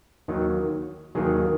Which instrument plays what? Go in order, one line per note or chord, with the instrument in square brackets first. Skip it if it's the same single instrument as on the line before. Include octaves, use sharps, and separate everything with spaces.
[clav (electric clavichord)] D#2 D#3 F#3
D#2 D#3 F#3 G#4